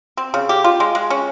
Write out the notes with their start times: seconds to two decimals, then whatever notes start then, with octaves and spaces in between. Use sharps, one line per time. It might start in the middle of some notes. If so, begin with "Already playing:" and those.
0.17 C4
0.34 C#3
0.49 G4
0.64 F4
0.80 G#3
0.95 G#3
1.10 C#4